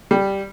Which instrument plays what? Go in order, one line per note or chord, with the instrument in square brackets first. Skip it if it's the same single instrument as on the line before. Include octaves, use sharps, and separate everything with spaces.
[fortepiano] G3